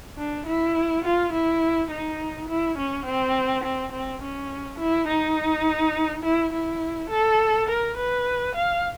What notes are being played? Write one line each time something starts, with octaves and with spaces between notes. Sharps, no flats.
D4
E4
F4
E4
D#4
E4
C#4
C4
C4
C4
C#4
E4
D#4
E4
E4
A4
A#4
B4
F5